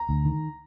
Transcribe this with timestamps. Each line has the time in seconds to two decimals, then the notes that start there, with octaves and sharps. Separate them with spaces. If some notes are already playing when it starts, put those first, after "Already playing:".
Already playing: A#5
0.09 D2
0.25 D#3